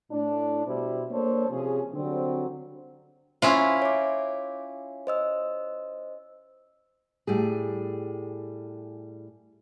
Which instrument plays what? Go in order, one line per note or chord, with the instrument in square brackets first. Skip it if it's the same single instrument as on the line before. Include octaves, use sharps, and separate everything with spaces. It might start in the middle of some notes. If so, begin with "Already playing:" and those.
[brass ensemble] A2 D4
B2 G3 E4 C5
A#3 D4 A4 C5 C#5
C3 F3 C#4 G#4
D3 F#3 G3 C4
[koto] C#4 E4 F4 [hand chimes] C5 C6
[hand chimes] C#5 E5 D6
C5 D#5 E6
[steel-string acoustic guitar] A2 G3 G#4